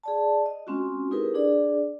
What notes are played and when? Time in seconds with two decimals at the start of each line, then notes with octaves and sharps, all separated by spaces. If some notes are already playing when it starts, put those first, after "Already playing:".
0.03 G#4 D5 A5
0.46 D#5
0.67 G#3 C4 C#4 F4 F#4
1.11 D#4 E4 G4 G#4 A#4 B4
1.34 D4 G#4 D5